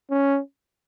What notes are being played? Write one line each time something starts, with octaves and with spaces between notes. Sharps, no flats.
C#4